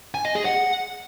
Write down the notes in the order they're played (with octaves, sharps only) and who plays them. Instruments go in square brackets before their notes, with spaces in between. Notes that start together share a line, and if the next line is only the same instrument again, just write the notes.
[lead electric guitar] G#5
D#5
G#4
F#5